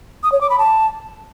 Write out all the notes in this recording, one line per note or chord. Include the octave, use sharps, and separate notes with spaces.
D#6
C#5
D6
B5
A5